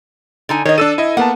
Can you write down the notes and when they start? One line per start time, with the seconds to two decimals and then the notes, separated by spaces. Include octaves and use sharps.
0.49 D3 D#4 G#5
0.65 D#3 C#5 D#5
0.78 D4 A4 E6 D#7
0.98 E4 D#5
1.17 A#3 B3 F#5 A5